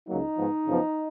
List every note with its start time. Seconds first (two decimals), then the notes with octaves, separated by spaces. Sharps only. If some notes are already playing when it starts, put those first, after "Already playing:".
0.08 C#2 C#3 F#3 A#3 D#4
0.37 G#2 F3 B3
0.66 F#2 C#3 F3 B3